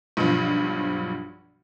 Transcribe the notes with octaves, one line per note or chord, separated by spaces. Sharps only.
B1 G2 F3